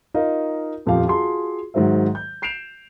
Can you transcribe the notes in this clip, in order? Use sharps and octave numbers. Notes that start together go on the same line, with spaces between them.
D#4 F4 A#4 D#5 F5
D#1 F2 F3 G4 F5
F4 F#4 G#4 A5 C6
G#2 D#3 F#3 C5 E5
G6
G6 C7 D7 E7 F7